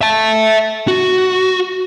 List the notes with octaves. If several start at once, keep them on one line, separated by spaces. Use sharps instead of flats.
E5 A5
F#4